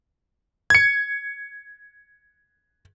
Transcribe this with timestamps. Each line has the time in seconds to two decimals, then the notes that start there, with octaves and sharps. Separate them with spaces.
0.70 G#6 C#7